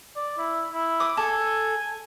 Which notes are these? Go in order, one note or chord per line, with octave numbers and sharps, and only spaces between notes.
D5
E4
E4
D6 D#6
A4 G#5